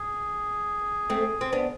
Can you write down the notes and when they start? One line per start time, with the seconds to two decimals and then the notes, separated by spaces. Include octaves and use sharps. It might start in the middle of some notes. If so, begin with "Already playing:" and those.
Already playing: G#4
1.10 A3 C4
1.41 C4
1.53 B3 D4